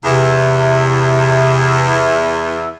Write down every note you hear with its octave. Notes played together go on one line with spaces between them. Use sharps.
E2 C3 E5